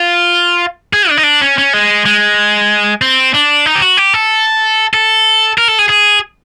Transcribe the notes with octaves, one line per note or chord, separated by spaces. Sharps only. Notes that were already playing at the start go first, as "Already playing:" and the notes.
Already playing: F4
G#4
D4
D#4
D4
C#4
C#4
G#3
G#3
C4
D4
D#4
G4
F#4
G4
A4
A4
A#4
A4
G#4
G#4